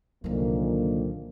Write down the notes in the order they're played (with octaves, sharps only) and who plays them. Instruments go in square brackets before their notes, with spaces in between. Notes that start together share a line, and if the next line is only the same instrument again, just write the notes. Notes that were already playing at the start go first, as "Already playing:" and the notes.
[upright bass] C2 F#3 [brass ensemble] A#2 D3 [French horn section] D#3 F3 A#3